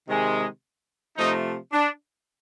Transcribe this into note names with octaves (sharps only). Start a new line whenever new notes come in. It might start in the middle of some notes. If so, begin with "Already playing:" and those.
C3 D#3 G#3
C3 F3 A3 D#4
D4